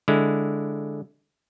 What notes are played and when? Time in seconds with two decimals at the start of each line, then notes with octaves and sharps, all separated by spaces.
0.08 D3 G#3 E4